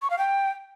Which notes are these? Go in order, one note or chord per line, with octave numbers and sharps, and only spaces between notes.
C#6
F5
G5